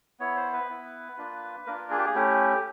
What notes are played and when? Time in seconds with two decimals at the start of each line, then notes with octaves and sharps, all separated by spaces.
0.20 B3 E4 C#5
0.37 C5
0.53 B4
0.69 B3 E4
1.17 A#3 D4 F4
1.67 A#3 D4 F4 A#4
1.91 G#4
1.98 G4
2.06 G#4
2.15 A3 C#4 E4 G4